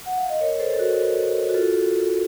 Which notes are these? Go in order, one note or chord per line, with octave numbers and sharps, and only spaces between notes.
F#5
F5
D#5
A#4 C#5
A4 C5
A4
F#4 A#4
F#4
F4 A4